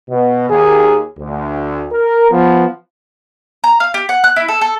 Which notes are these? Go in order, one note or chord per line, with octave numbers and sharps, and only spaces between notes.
B2
D#2 G#4
D2
A#4
F3 B3
A#5
F5
G4
F#5
F#6
E4
A4
A4